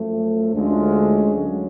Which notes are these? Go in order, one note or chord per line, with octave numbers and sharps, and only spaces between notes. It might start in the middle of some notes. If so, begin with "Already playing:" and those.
Already playing: F#2 F3 A3
D2 D3 G#3 C#4 F4
D2 D3 F#3